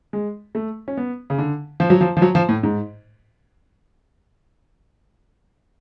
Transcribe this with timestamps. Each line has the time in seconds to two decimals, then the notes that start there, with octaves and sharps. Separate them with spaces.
0.13 G#3
0.55 A3
0.88 C#4
0.97 B3
1.30 C#3
1.38 D3
1.80 F3
1.90 F#3
2.01 F3
2.17 F3
2.22 F#3
2.35 F3
2.49 A2
2.63 G#2